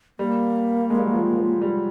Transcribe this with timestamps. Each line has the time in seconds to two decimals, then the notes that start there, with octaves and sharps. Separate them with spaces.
0.19 G3 A#3
0.90 G#3
0.98 G3
1.06 F#3
1.13 F3
1.38 F3
1.62 G3